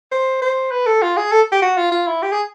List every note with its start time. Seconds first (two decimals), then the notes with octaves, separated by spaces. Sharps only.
0.12 C5
0.42 C5
0.71 B4
0.86 A4
1.02 F4
1.17 G#4
1.32 A4
1.52 G4
1.62 F#4
1.77 F4
1.92 F4
2.07 E4
2.23 G4
2.32 G#4